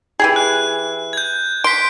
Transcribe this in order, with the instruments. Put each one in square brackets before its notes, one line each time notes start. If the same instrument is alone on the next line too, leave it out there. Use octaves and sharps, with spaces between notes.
[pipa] E3 G4 G#4
[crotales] F#6
G6 G#6
[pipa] C6 [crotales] B6 D7